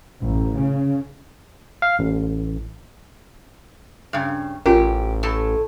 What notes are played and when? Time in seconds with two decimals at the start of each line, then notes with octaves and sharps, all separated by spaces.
0.22 A1
0.56 C#3
1.82 F5
1.99 A1
4.13 G2 C#3
4.66 A1 C#4 F4 G4 A#4
5.23 A2 A4 A5